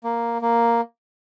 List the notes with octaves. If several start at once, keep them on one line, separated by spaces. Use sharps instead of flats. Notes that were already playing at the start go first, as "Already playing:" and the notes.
A#3
A#3